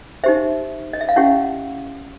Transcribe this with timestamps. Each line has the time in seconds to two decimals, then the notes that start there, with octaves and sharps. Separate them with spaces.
0.24 D#4 G4 C5 E5
0.93 D#5
1.01 E5
1.09 F5
1.16 C#4 E4 G4 F#5